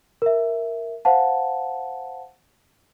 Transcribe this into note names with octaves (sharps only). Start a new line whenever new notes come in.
A#4 E5
C5 F5 F#5 A5